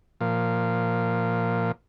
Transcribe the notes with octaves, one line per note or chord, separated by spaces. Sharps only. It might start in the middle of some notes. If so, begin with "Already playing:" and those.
A#2 F3